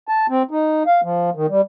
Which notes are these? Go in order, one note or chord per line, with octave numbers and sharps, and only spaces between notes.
A5
C4
D#4
F5
F3
D#3
G3